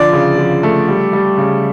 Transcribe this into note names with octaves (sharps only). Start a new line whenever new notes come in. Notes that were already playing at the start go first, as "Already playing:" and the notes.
Already playing: D3 F3 D5
C#3
F3
A3
G3
G3
C#3